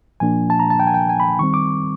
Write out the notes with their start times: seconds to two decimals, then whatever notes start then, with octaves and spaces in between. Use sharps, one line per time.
0.20 A#2 F3 A#3 D4 G#5
0.50 A5
0.60 A#5
0.70 A5
0.80 G5
0.87 G#5
0.94 G5
1.09 G#5
1.20 B5
1.39 D#3 G3 C4 C#6
1.54 D6